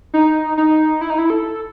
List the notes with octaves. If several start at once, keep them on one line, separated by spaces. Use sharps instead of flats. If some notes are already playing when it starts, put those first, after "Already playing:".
D#4
D#4
E4
D#4
E4
A4